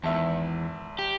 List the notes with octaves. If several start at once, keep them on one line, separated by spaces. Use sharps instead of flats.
G#1 E2 E5 A5
G4